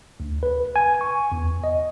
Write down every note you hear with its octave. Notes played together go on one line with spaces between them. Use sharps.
D2
B4
G#5
C#6
E2
D#5